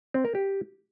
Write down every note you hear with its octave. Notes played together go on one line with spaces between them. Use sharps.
C4
A#4
G4